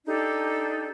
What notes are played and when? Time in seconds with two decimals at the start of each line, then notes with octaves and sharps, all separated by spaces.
0.06 D4 D#4 G4 A4